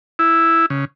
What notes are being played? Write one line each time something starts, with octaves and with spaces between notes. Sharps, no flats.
E4
C#3